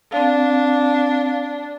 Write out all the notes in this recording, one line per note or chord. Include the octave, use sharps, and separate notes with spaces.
C4 D4 F5